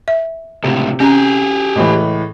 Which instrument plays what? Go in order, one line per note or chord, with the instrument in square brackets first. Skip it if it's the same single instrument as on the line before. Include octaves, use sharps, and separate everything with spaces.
[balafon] E5
[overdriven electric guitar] C#2 A2 [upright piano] C3
[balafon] C#4 A#5 [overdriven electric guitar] G4 G#4
[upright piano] C#2 A2 E3